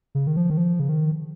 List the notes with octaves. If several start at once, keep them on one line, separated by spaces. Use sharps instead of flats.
C#3
D#3
F3
D#3
F3
C#3
D#3